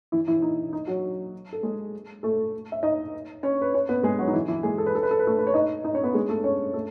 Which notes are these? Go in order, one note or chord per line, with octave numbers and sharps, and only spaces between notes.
E3 E4
E3 E4
D#4
D#4
F#3 F#4
A4
G#3 G#4
A3 A4
E5
D#4 D#5
C#4 C#5
B4
C#4 C#5
B3 B4
G#3 G#4
F#3 F#4
D#4
E3 E4
E3 E4
G#3 G#4
A4
B4
A4
B4
A4
B4
A3 A4
B4
C#5
D#4 D#5
D#4 D#5
C#4 C#5
B3 B4
G#3 G#4
A3 A4
C#4 C#5
A3 A4